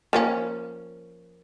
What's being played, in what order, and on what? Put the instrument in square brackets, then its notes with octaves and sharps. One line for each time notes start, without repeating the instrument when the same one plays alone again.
[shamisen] F3 A#3 C#4